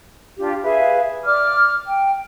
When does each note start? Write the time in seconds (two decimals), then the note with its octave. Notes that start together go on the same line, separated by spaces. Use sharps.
0.38 D4 F4 G4
0.62 G#4 B4 E5 F5
1.25 D5 D6 F6
1.86 G5